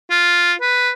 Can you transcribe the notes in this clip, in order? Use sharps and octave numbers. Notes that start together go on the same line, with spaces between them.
F4
B4